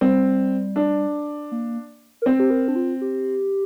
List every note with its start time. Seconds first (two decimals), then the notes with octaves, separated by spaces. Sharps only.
0.01 G3 C4
0.76 D4
1.52 A#3
2.22 A#4
2.26 C4 C5
2.40 G4
2.51 A#4
2.68 D4
2.76 F4
3.01 G4